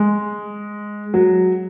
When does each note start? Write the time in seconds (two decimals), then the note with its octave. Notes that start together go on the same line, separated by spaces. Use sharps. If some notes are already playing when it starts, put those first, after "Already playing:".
Already playing: G#3
1.14 F#3